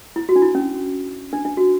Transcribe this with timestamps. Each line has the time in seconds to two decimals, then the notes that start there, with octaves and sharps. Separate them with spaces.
0.16 E4
0.29 F#4
0.36 D4
0.42 E4
0.55 C#4
1.33 D4
1.45 D4
1.57 F#4